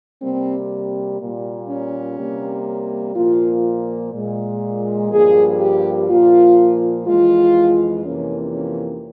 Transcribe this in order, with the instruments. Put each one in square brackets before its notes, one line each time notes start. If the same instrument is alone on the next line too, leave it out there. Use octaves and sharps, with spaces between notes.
[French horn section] C3 G3 A#3 C4
A#2 G3 A#3
C#4
C3 G3 A#3
A#2 F3 A#3 F4
A#2 G#3
G2 F3 A#3 G#4
G4
A#2 F3 A#3 F4
F2 E3 G#3 F4
F2 C3 E3 A#3 C#4
C#4